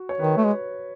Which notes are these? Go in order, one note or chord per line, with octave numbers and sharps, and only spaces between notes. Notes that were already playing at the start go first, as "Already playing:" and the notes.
Already playing: F#4
C#5
D#3 B4
A3
G#3